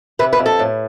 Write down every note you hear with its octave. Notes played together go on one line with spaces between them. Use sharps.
C3 B4
B4
F2
A4
A2